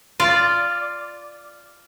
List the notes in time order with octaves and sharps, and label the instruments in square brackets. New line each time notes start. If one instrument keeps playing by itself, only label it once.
[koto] F4 D5